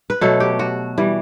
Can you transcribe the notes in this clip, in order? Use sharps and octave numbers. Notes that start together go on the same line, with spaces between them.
B4
B2 F#3 A3 A4
G4
F#4
E3 G3